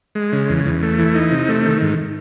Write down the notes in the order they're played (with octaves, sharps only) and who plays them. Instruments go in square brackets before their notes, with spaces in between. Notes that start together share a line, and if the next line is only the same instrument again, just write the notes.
[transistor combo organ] G#3
C#3
E2
E2
A3
E3
D#4
C3
A3
D#3
G#2